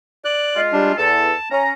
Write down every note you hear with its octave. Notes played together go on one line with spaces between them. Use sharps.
D5 F#6
G#3 F4
G3 D4
E2 A4 A5
C#4 A#5